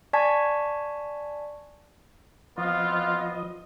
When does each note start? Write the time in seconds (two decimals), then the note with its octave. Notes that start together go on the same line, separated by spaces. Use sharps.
0.13 D5 G#5 A5 C#6 G#6 B6
2.58 F3 B3 C4 F4 D#5